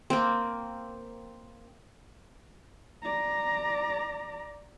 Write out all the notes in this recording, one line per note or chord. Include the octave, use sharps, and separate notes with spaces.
A#3 C4
D5 A#5